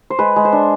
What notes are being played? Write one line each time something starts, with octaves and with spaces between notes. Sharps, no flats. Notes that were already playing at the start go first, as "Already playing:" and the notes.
C5
G#3 B4
G#3
C5
D4